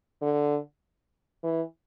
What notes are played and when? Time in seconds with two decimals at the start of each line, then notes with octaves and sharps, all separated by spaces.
0.22 D3
1.43 E3